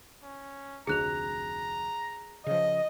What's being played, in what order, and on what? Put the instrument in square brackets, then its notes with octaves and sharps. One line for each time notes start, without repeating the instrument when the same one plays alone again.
[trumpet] C#4
[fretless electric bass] F1 D2 [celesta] G#4 F#6 F7 [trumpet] A#5
[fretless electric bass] C#3 F3 [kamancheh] D#5